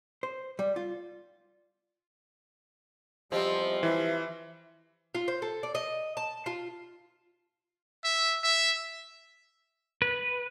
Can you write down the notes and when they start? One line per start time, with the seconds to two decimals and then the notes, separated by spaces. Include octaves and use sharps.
0.23 C5
0.59 G3
0.76 F4
3.32 E2 F3 G3 C4 G4 D#5
3.83 E3 E5
5.15 F4
5.28 C5
5.42 A4
5.63 D5
5.75 D#5
6.17 A5
6.46 F4
8.05 E5
8.43 E5
10.02 B4